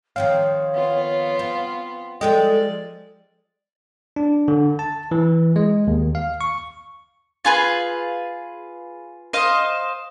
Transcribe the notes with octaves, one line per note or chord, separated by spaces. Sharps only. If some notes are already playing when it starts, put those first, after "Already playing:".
D#3 F3 C4 C#5 F5
B3 F4
C4
F3 G#3 G4 A4 D5 D#5
D4
D3
A5
E3
G#3
D#2
F5
C#6
F4 G#4 B4
C5 D#5 F5